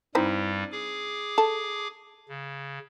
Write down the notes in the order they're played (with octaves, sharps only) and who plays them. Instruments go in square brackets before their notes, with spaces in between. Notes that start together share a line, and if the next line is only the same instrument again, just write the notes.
[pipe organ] G2 G3 [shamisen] C4 D#4 E4
[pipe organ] G#4 D6
[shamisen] A4
[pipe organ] C#3